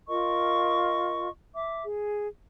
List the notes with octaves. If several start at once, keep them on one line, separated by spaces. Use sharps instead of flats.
F4 A#4 D#5 C#6
E5 D6
G#4